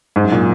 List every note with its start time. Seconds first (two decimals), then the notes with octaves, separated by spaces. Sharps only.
0.16 G#2
0.24 F#2
0.32 A#2